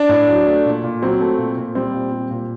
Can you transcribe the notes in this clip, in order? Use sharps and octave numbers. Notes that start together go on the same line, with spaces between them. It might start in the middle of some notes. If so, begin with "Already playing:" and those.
Already playing: D4
A2
F#3
A3
A#2
A#2
F#3 C4
A3
A#2
A#2
G3 C4
A#2
G3
A#2